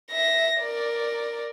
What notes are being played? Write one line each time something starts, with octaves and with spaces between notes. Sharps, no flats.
E5 A#6
A#4 D5